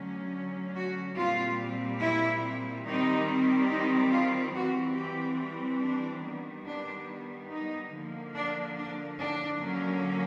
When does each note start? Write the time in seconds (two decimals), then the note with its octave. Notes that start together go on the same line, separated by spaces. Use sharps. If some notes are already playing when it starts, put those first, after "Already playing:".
Already playing: D3 F#3 A3 C#4
0.74 F#4
1.16 A#2 G3 C4 F4
2.01 E4
2.85 D#3 G3 C4 D#4
3.70 D#4
4.12 F4
4.54 E3 G3 C4 F#4
4.97 G4
5.81 D4
6.24 D#3 G3 B3
6.66 D4
7.50 D#4
7.92 D3 F3 A#3
8.35 D4
8.77 D4
9.19 D4
9.61 D3 F#3 A#3 C#4